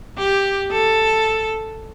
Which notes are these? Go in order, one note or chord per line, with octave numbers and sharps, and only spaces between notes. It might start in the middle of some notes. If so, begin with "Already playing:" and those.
G4
A4